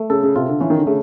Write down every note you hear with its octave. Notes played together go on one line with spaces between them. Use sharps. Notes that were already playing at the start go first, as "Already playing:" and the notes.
Already playing: A3
C#3 A4
C#3
C3 F4
D3
E3 C#4
D#3
D3
C#3 A3